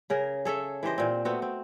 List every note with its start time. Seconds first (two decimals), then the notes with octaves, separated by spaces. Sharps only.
0.10 C#3 G#4 A#4
0.45 G#4 A4 C#5 E5
0.83 E3 G4 C5 D#5
0.98 A#2 C4
1.25 A3 B3 C4 F#4
1.42 C4